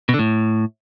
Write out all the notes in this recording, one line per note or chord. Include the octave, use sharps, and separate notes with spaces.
B2
D3
A2